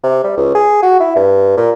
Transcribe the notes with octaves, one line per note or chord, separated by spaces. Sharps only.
C3
G3
C#2
G#4
F#4
E4
G2
A#2